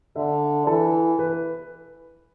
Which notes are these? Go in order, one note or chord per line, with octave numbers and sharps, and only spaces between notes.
D3 E5
E3 A4
B4